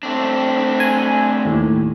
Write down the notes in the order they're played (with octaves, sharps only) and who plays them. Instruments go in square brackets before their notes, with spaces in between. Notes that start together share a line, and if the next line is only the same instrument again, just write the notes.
[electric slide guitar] A3 C4 D4
[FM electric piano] G#5
D#2 A2